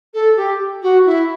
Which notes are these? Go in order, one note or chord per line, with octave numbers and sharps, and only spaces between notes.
A4
G4
F#4
E4